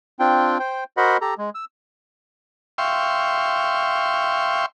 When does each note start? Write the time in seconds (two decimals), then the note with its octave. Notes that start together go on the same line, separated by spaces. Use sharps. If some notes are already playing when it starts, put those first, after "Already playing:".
0.20 C4 D4 F4 G5
0.59 C5 G5
0.97 F#4 A#4 C5 D#5 F#5 B5
1.21 G4 A4 A#5
1.38 G#3
1.55 E6
2.78 E5 F5 G5 C6 C#6